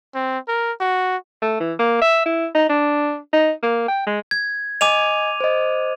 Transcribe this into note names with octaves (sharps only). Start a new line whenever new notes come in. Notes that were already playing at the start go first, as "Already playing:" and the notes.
C4
A#4
F#4
A3
E3
A#3
E5
E4
D#4
D4
D#4
A#3
G5
G#3
G#6
D#5 G#5 D6 D#7 F7
C5 D#5